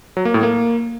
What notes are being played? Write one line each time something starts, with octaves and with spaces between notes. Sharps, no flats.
F#3
A#3
A2
A#3